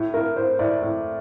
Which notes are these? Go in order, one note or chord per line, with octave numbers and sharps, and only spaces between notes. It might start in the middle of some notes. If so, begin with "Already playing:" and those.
Already playing: A2
A2 A#4
A2 C5
A2 D5
A2